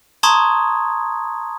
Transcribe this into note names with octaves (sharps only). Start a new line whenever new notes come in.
A5 A#5 C6 C#6 D#6 G#6